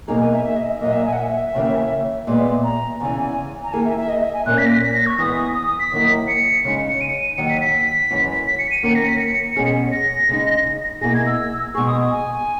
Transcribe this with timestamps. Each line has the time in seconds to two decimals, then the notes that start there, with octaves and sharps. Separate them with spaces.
0.08 B2 F#3 A#3 D#4 G#4 A#5
0.20 G#5
0.33 E5
0.45 E5
0.56 D#5
0.69 E5
0.81 A#2 F#3 A#3 D#5
0.93 E5
1.05 G#5
1.13 F#5
1.18 E5
1.54 D#2 C#3 E3 A#3 C#4
2.27 A#2 G#3 B3 D#5
2.39 E5
2.64 A#5
3.00 E2 C#3 E3 G#5
3.64 A#5
3.73 D#3 A#3 E4 G#4 G#5
3.85 E5
3.97 E5
4.09 D#5
4.21 E5
4.34 G#5
4.46 A#2 A#3 C#4 F#6
4.58 B6
4.66 A#6
4.70 B6
4.82 B6
4.94 A#6
5.06 C#6
5.18 E3 G#3 B3 D#6
5.55 D#6
5.67 D#6
5.79 B6
5.92 D#2 D#3 F#3 A#3 E4
6.28 C#7
6.64 C#3 G#3 D#4
6.90 C#7
7.01 D#7
7.37 D#2 D#3 F#3 C#7
7.49 B6
7.61 B6
8.11 F#2 E3 G#3 C#4 F#4
8.47 B6
8.59 C#7
8.71 D#7
8.83 D#3 A#3 C#4 F#4 C#7
8.95 A#6
9.07 B6
9.20 C#7
9.56 B2 G#3 C#4 G#4
9.92 A#6
10.29 C#3 G#3 D#4
11.01 B2 A#3 E4 G#4 A#6
11.14 G#6
11.26 E6
11.75 B2 G#3 D#4 G#4 C#6
11.87 D#6
12.11 G#5